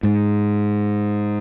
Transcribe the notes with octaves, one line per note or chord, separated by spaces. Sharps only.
G#2